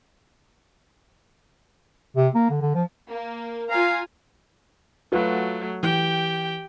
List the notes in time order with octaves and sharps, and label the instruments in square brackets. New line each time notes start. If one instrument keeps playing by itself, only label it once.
[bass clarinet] C3
A#3
D3
D3
F3
[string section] A#3
[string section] F4 G#5 A#5 [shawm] F5
[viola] F#3 A3 [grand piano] F4 F#4 B4
[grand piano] E3 [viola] G4 G5